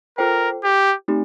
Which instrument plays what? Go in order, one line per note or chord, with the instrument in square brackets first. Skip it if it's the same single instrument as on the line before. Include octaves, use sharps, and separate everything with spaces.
[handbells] F4 A4 C5 G5 [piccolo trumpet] A#4
[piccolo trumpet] G4
[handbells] A3 C4 D#4 G4